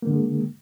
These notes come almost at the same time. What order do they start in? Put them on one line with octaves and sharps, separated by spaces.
A#3 D3 G#3